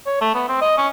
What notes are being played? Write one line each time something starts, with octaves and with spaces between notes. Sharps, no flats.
C#5
A3
B3
C4
D#5
C#4